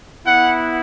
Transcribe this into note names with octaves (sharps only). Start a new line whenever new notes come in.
B3 E4 F#5